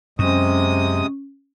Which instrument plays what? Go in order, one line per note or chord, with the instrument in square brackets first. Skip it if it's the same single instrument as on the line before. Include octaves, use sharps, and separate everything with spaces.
[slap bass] F#2 [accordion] C3 G#3 D#6 [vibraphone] C#4